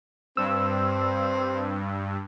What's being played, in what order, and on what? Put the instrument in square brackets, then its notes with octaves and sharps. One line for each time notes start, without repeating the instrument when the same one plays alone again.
[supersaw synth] G2 [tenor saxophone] C4 [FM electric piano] E6